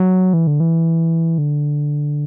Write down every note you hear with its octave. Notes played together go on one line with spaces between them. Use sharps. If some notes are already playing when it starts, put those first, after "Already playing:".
Already playing: F#3
E3
D3
E3
D3